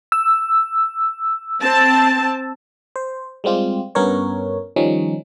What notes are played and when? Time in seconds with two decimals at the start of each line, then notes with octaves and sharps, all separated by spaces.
0.12 E6
1.62 C4 A5
2.96 C5
3.44 G3 G#3 C4 F4 G4
3.95 G2 B3 C#4 A#4 C#5
4.76 D#3 F3 G3 C#4 D#4